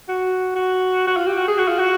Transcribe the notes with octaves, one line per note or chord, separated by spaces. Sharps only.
F#4
F#4
F#4
F4
G4
F#4
G#4
F#4
F4
F#4